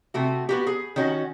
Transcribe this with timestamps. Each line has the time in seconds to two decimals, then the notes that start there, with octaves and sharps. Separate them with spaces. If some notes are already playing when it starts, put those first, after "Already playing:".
0.14 C3 A3 F#4
0.49 B3 F#4 G4
0.67 G#4
0.96 D#3 C#4 F#4